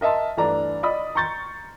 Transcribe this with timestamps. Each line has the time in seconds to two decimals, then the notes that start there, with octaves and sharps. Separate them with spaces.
0.01 A#4 D#5 E5 A5 C6
0.37 G2 E3 A3 D4 A#5
0.83 D5 D#5 B5 D#6
1.15 A#5 C6 C#6 G6 A6